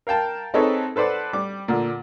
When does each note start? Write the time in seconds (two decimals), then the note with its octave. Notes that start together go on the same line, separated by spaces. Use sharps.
0.07 A#4 F5 G5 A5
0.54 C4 D#4 G#4 A4 B4 C#5
0.96 A4 B4 C5 D5 F#5
1.33 G3 D6
1.68 A#2 D3